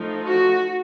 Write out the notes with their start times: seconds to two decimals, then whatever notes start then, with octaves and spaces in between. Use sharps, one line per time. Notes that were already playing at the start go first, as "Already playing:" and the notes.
Already playing: F3 A3 D#4
0.24 F#4